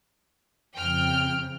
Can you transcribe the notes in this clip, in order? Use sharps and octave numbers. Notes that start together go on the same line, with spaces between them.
F2 C#3 G5 F6